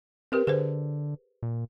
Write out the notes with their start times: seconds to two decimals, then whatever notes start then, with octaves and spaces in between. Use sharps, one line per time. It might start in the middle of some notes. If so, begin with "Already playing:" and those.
0.32 C4 G4 A#4 B4
0.47 D3 G#4 B4 C5
1.43 A#2